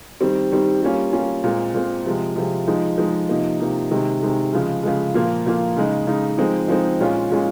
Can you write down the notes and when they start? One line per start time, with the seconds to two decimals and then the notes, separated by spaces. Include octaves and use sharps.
0.21 D#3 G3 C4
0.52 D#3 G3 C4
0.82 G3 A#3 C#4 F4
1.13 G3 A#3 C#4 F4
1.44 A#2 G#3 C4
1.74 A#2 G#3 C4
2.06 C3 F3 G#3
2.36 C3 F3 G#3
2.67 F3 G#3 D#4
2.98 F3 G#3 D#4
3.29 C3 F3 A#3 D#4
3.60 C3 F3 A#3 D#4
3.91 C3 D#3 G#3
4.22 C3 D#3 G#3
4.53 C#3 F3 G#3
4.83 C#3 F3 G#3
5.14 A#2 F3 A#3 F4
5.46 A#2 F3 A#3 F4
5.76 C#3 G#3 D#4
6.07 C#3 G#3 D#4
6.38 F3 G#3 C4 D#4
6.68 F3 G#3 C4 D#4
7.00 A#2 G#3 C#4 F4
7.31 A#2 G#3 C#4 F4